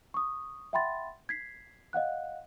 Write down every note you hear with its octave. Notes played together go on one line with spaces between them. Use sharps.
C#6 D#6
E5 F#5 G5 B5 C6 A6
G#6 B6 C7
D#5 F5 F#5 F#6